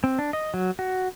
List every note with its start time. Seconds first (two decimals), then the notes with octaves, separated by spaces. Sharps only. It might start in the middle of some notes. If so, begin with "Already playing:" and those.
0.04 C4
0.19 D4
0.33 D#5
0.54 F#3
0.79 F#4